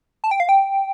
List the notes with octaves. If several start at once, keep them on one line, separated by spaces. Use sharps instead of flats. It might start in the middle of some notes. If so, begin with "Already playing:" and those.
A5
G5
F5
G5